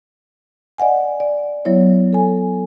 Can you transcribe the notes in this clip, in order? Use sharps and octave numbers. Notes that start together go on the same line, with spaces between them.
D5 D#5 F#5 G#5
D5
F#3 B3 E4 C#5 E5
A4 G#5